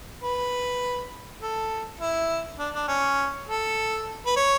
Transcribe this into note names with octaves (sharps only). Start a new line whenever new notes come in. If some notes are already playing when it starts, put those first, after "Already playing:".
B4
A4
E4
D4
D4
C#4
A4
B4
C#5